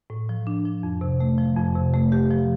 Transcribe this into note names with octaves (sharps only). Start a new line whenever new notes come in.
A2
F3
D4
F3
F2
C3
A3
F3
F2
C3
A3
G4
F3